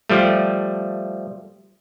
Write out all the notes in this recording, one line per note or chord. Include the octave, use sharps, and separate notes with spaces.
F3 G3 A3